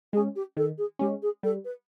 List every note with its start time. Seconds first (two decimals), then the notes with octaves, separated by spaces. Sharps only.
0.13 G#3 G#4
0.17 C#4
0.36 G4
0.57 D#3 A4
0.78 G#4
0.99 G#3 C#4 G4
1.22 G#4
1.43 G3 A4
1.65 B4